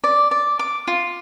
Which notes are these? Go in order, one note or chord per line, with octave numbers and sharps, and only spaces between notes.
D5
D5
D6
F4